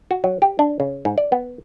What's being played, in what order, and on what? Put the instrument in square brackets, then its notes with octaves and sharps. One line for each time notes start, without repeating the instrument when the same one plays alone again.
[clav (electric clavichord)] F#4
F#3
G4
D4
C#3
G#2
D5
B3